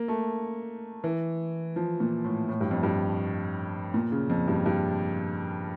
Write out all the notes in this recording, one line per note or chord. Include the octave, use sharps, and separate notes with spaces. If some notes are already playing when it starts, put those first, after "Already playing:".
Already playing: A#3
A3
E3
F3
A#2
A2
A2
G2
F2
G2
A#2
C#3
F2
G2
G2